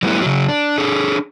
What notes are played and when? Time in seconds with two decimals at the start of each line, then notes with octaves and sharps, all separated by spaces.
0.03 F#3 G3 A3 B3 D#4 E4
0.22 C#3 F#3
0.49 D4
0.78 D4 G#4 A4